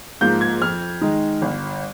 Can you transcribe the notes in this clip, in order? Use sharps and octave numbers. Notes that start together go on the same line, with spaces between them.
G#2 F3 A#3 G6
G#6
F2 F6
D#3 G#3 D#4
G1